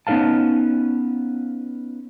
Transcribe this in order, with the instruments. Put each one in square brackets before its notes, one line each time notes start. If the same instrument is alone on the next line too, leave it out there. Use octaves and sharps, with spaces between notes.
[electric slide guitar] B3 C#4 D#4 B4 F5 A5